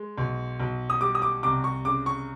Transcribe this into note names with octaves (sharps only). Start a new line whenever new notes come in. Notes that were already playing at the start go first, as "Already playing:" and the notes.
Already playing: G#3
B1
B1
D#6
G3 D6
D#6
D6
C2 D6
C#6
C#3 D6
C#6